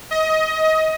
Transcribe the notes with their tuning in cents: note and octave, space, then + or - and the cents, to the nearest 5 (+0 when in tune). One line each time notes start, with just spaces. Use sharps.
D#5 +25